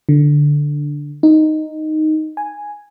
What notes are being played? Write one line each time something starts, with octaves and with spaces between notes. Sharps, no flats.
D3
D#4
G#5